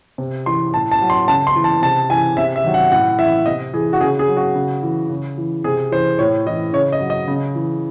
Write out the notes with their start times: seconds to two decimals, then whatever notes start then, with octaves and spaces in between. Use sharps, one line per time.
0.18 C3
0.46 E3 C6
0.74 A2 A5
0.92 A5
1.01 F#3
1.10 C6
1.28 C#3 A5
1.47 C6
1.56 E3
1.64 A5
1.82 C3 A5
2.10 E3 G#5
2.37 C3 E5
2.56 E5
2.64 D#3 F#3
2.74 F#5
2.92 A2 F#5
3.19 E3 E5
3.46 C3 D#5
3.73 E3 G#4
3.93 F#4
4.00 C#3 G#4
4.19 G#4
4.28 F#3
4.37 F#4
4.55 C#3
4.83 E3
5.09 C#3
5.38 E3
5.64 C3 G#4
5.91 E3 C5
6.19 A2 C#5
6.46 E3 D#5
6.73 C#3 C#5
6.92 D#5
7.01 F#3
7.10 D#5
7.28 C#3
7.55 E3